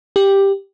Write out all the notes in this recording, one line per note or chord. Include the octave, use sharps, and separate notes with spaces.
G4